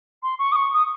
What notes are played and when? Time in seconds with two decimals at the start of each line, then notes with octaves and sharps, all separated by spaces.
0.23 C6
0.39 C#6
0.52 D#6
0.56 C#6
0.74 D#6